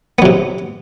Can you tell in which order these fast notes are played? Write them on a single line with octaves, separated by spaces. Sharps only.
B3 F#3 C3